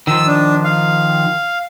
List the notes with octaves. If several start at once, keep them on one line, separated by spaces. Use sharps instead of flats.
D#3 F3 E6
D4
F5